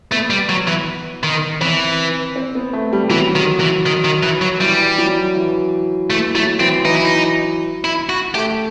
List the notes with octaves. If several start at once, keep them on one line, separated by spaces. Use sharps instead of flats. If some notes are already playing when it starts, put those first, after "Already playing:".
A3 B3
G3
F#3
E3
D#3
E3 C4
C4
B3
A3
G3
G3
E3 F#3
D#3
E3
D#3
D#3
E3
F#3
E3 G3
F#3
E3
E3 A3
F#3 A3
E3 C4
E3 D#4
E4
D#4
E4
F#4
A3 G4